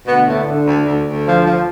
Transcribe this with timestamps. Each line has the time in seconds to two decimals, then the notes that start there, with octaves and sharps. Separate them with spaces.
0.06 D2 B2 B3
0.27 A2 D3 A3
0.47 D3
0.66 D2
0.86 D2
1.06 D2
1.26 F3
1.46 F3